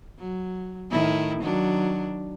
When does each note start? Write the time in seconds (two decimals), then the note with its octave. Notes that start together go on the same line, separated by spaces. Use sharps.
0.19 F#3
0.91 A2 D#3 E4
1.41 D#3 F#3 D4